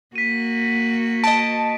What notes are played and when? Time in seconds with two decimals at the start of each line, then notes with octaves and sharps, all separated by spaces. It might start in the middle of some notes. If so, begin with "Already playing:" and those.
0.16 A#3 F#4 B6 D#7
1.24 D#5 A5 D7